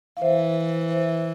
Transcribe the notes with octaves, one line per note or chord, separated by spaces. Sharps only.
F5
E3 C5 E5
C5 E5